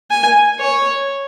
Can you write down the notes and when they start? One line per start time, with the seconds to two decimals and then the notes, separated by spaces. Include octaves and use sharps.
0.11 G#5
0.60 C#5